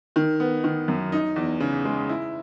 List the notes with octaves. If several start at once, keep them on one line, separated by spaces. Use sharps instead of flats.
D#3
B3
D#3
F#2
D#4
E2
C#3
G#3
E4